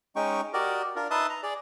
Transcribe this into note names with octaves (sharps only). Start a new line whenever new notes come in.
G#3 C#4 D#4 G5 C#6
F#4 G4 A#4 D5 D#5
D4 F4 A#4
D#4 B4 E5 A5 C6 D#6
A#5
G#4 D5